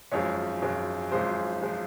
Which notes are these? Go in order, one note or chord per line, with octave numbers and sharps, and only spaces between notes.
G#1 F#2 F3 G#3 C#5
G#1 F#2 F3 G#3
G#1 F#2 F3 G#3 C5
F3 G#3